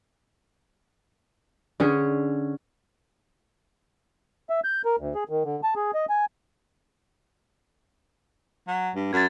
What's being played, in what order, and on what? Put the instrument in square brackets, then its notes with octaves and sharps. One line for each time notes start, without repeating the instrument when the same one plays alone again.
[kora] D3 C#4 G#4
[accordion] E5
G6
A#4
D2
G#4
D#3
D3
A5
G#4
D#5
G#5
[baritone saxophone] F#3
G2
[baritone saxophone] F#2 [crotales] G#6 A6